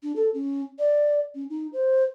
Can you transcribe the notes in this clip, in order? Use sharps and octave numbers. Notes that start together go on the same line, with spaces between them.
D4
A4
C#4
D5
C#4
D#4
C5